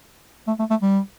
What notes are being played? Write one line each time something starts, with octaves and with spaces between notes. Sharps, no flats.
A3
A3
A3
G3